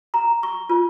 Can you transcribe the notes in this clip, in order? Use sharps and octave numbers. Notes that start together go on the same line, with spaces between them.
A#5
C#6
F4